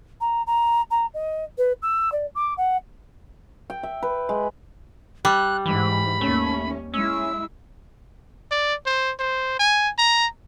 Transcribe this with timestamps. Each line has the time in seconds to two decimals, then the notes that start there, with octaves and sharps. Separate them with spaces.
0.21 A#5
0.47 A#5
0.91 A#5
1.14 D#5
1.58 B4
1.82 E6
2.12 D5
2.35 D6
2.57 F#5
3.70 G5
3.83 E5
4.03 B4
4.29 G#3
5.25 G3 F#6
5.66 G#2 E3 B5
6.21 D#2 A3 C#4
6.94 G#3 C#4 E4 E6
8.51 D5
8.86 C5
9.19 C5
9.59 G#5
9.98 A#5